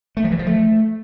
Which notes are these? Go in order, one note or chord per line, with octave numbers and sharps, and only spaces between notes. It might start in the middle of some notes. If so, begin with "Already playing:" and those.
A3
F3
E3
F3
A3